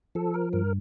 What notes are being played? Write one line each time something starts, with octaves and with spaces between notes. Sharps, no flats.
F3 A4
A#4
G2 A#4